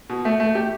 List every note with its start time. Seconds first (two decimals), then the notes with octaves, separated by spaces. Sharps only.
0.10 B2
0.25 A3
0.40 A3
0.55 G4